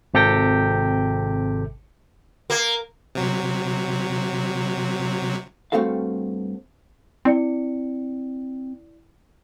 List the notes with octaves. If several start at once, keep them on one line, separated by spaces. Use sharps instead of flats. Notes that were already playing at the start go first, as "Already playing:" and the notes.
G#1 C3 G4 A4 G5 A#6
A#3
C3 F#3
G2 A3 C4 F#4 A4 F5
C4 E4 D5 C#7